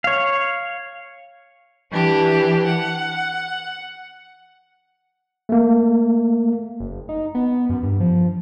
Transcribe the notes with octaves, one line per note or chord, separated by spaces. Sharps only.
C#5 F5
E3 D4 G4
F#5
A3 A#3
F#1
D#4
B3
F#2
G2
F3